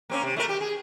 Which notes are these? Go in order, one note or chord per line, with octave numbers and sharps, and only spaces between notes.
A#3 C4 C#4
C3
A3 D#4 A#4
G4
G#4